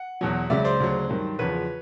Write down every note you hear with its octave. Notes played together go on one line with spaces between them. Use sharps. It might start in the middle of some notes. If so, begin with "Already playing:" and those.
Already playing: F#5
E2 B2 F#3
C#2 C#3 F#3 D5 E5
C5 D5
D2 C#3 F#3
G2 D#3 F#3
E2 C#3 F3 B4 C#5